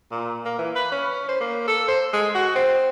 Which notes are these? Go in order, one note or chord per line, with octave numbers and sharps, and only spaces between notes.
A#2
A#3
E3
B4
C#4
C5
A#3
A4
C5
G#3
F#4
C4